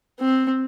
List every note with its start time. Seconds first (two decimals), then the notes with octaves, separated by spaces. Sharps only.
0.20 C4